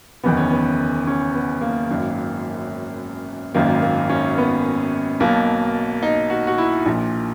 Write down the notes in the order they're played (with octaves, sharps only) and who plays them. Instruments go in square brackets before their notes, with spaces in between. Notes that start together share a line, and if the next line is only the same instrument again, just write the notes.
[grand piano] F#1 E2 D#3 B3
C#4
B3
C#4
B3
A#3
G#1 F#2 D#3
G#1 F#2 D#3 A#3
A#3
C#4
B3
B1 B2 A#3
D#4
F#4
F#4
E4
A#1 A#2